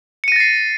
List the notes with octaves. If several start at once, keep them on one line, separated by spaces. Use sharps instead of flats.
A6 A#6 C7 C#7 D#7